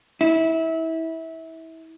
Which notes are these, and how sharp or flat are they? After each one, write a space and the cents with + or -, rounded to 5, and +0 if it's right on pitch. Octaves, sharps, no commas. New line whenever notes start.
E4 -25